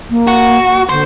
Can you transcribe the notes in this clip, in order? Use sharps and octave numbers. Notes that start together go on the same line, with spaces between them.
A#3
F#4
D3 C5